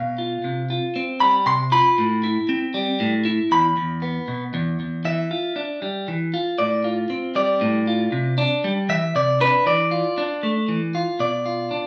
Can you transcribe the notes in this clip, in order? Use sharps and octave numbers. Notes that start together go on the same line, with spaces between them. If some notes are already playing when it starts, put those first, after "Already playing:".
Already playing: B2 F5
F4
C3
F4
C4
G3 B5
C3 C6
F4 B5
A2
E4
C4
G3
A2
E4
E2 B5
E2
B3
B2
E2
E2
E3 E5
F4
D4
G3
E3
F4
A2 D5
F4
C4
G3 D5
A2
F4
C3
D4
G3
E3 E5
C3 D5
D4 B4
E3 D5
F4
D4
A3
E3
F4
B2 D5
F4
D4